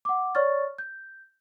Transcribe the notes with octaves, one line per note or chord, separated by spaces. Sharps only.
F#5 D6
C#5 D5 C#6 F6 A6
G6